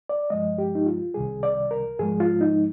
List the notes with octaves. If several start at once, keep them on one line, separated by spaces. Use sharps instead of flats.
D5
G2 F3 G#3 D#5
G4
D#4
F4
C2 C3 D#3 G3 G#4
D5
A#4
G#2 F3 G#3 G#4
F4
D#4